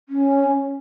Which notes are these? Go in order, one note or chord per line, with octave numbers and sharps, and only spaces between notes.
C#4